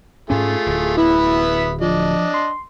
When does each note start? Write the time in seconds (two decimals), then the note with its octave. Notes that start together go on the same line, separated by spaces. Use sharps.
0.30 G#2 A3 C#4 F4 G#4
0.66 D1 D2
0.97 B3 E4 E5 B5
1.81 F3 D4 D#5
2.34 C6